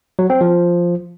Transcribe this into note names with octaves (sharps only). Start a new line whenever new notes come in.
F#3
C4
F3